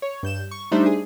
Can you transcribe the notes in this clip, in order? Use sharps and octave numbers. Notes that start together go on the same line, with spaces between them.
C#5
G2 G6 E7
C#6
G3 A3 D4 D#4 C5 E5
G#4